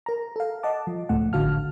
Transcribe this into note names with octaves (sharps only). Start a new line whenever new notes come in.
A#4 A#5
A4 F5
D#5 F#5 A5 D6
F3
C#2 A2 A3 F#5
G#1 D3 F#4 F5 A5 F6